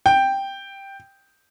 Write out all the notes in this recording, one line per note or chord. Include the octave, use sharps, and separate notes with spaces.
G5